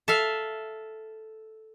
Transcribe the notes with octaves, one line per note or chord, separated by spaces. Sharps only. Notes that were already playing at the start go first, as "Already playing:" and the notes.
A4 E5 F5